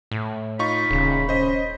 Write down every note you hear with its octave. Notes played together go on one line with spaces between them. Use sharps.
A2
D#4 F4 B5 C#6
D#1 C#3
C#4 C5 D#5